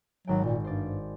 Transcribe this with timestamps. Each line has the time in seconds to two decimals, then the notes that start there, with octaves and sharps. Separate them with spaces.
0.27 G#1 F#3 G5
0.44 A#2
0.64 G2 C5 D5